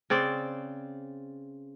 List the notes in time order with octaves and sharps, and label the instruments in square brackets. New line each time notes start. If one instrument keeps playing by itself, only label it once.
[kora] C#3 C4 D5